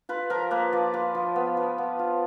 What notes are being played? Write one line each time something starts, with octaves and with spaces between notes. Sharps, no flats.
F4 B4
F3 A#4
A#3 B4
F3 D5
F4 B4
F3
B3
F3
B3
F4